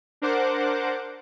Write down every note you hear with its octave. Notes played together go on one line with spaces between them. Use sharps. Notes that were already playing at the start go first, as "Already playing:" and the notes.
D4 A#4 C5 F#5 D6